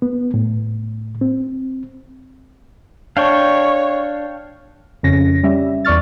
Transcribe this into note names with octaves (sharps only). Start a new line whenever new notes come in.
B3
A2
C4
D4 C#5 F5 G5 C#6
F2 C#3 C#4 A#6
G3 C#4 E5
E2 D5 C#6 F6 A6